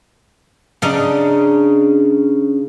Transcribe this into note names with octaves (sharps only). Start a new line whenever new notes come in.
C#3 D4 D#4